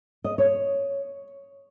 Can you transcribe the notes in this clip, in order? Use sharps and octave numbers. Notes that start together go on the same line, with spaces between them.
D#5
C#5